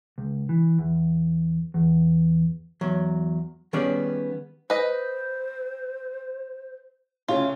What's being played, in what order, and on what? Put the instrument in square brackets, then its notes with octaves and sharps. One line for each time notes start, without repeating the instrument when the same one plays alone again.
[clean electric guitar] C#2
E3
E2
E2
[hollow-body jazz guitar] E2 F#3
D#3 G3 B3 C#4 G#4 D5
[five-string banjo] B4 D#5 [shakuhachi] C5
[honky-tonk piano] A2 C#3 C#4 [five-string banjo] F4